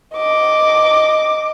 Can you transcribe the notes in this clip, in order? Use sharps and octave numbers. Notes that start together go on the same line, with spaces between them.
D#5 D6